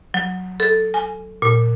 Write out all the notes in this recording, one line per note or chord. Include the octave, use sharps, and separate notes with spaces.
F#3
A4
G#5
A#2